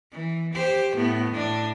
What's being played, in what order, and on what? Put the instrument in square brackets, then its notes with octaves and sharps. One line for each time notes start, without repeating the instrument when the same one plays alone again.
[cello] E3
G4 C5
A2 B3
A2 D4